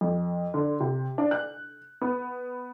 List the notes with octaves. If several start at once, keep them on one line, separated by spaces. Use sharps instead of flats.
F2
D3
C3
D4
F#6
B3